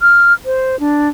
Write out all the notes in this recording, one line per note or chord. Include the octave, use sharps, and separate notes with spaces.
F6
C5
D4